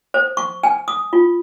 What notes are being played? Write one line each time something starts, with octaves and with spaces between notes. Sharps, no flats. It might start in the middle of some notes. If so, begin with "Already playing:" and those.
C5
C#6
G#5
D#6
F4